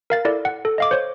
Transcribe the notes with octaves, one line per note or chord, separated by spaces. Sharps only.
A#4 F5 A6
E4 A4 A#4 D5
F#5
A4
D#5 F5 D6
C5 C#5